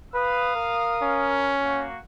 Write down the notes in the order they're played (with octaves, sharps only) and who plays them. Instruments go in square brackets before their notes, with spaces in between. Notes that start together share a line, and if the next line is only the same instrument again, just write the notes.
[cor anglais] B4 [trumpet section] F5 D#6
[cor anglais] A#4
[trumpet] C#4
[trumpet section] A#3 F#4